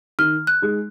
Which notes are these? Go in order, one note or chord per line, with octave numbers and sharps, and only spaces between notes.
D#3 F6
F#6
G#3 D#4 G#4